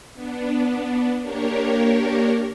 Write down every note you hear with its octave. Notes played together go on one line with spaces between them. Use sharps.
B3 D4
A#3 D4 G4 A#4 C#5